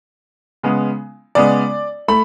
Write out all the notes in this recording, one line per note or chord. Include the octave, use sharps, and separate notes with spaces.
C#3 G#3 B3
C#3 G#3 B3 D5
A3 B5